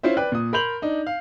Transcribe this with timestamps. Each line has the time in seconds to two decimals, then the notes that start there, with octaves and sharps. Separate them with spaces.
0.03 C#4 E4 F4 C5 E5
0.17 B4 D5 G5 B5 F#6
0.32 A#2 D#6
0.53 A#4 B5 C6 G6 F7 F#7
0.82 D4 D#4
1.07 F5